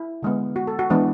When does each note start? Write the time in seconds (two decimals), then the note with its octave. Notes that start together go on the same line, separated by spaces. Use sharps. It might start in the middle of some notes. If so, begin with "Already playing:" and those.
Already playing: E4
0.23 D3 G#3 B3
0.56 F#4
0.67 A4
0.79 F#4
0.90 E3 G#3 B3 D4